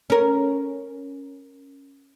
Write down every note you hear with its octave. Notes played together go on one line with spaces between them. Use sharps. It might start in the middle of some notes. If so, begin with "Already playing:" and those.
C#4 A#4